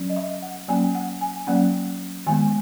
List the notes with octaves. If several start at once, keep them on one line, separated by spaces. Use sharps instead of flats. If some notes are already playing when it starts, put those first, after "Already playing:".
Already playing: F#3 C#4
D#5
E5
F#5
F#3 A#3 C#4 G#5
F#5
G#5
F#3 A#3 C#4 F#5
D#3 G#3 B3 G#5